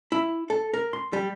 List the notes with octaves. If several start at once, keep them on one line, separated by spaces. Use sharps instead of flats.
E4
A4
A#4
C6
G3